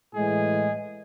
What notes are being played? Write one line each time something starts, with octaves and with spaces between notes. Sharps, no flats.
A2 E3 G#3 G#4